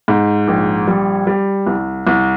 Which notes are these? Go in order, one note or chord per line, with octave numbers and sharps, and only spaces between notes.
G#2
A#1
G3
G3
C2
C2